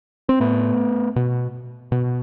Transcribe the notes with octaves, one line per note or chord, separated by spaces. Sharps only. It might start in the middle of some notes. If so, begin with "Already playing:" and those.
C4
A2 A3 B3
B2
B2